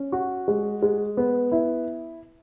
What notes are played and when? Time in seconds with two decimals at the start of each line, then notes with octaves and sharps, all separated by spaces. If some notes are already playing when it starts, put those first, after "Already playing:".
Already playing: C#4
0.12 F#4
0.48 G#3
0.82 G#3
1.17 B3
1.52 E4